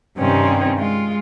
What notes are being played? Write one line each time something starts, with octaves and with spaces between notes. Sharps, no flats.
G2 C3 D#3 C4 C#4
G#3 F4